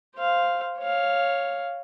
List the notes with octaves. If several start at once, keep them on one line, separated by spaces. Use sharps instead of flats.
C5 F5
C#5 F5